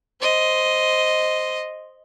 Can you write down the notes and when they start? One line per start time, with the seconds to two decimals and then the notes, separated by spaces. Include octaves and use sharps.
0.21 C5 D#5